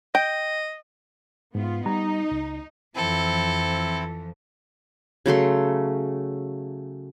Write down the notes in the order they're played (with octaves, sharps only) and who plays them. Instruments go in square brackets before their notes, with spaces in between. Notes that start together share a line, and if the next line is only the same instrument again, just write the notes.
[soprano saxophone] D#5 [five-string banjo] G5
[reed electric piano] G#2 [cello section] B3 F4
[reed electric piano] G3 A#5 [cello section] D#4
[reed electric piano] C#2
[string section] F2 E3 F3 [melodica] C4 E4 [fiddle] A4
[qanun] C#3 F#3 A3 C6